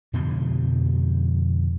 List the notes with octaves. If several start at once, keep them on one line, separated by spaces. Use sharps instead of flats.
F2 B2 D3 F3